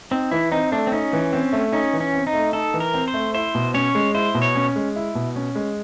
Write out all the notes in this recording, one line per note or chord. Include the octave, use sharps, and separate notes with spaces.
C4 D#4
E3 E4
C4 D#4
A3 D4
C4
C#4 D#4
E3
C4
A3
C#4 D#4
E3
C#4
C4
D#4
A3
D#4 A4
E3
A#4
C4
C5
A3
E4 C5
B2
C#4 C#5
G#3
E4 C5
B2
C#5
C#4
G#3
E4
B2
C#4
G#3